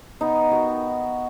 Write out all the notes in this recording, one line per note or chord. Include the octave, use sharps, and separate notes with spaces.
B3 D#4
D#3 F#4